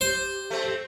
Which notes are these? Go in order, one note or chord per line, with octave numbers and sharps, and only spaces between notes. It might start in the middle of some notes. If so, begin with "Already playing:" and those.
G4 C5
A3 C4